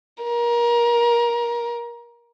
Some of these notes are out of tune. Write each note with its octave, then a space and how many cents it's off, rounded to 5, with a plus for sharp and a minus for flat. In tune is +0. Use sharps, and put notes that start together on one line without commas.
A#4 +25